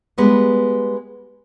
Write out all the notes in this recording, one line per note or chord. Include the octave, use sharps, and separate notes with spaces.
G3 G#3 B3